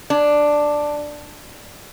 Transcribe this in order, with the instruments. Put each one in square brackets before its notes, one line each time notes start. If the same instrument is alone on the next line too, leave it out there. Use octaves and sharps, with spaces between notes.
[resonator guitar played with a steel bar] D4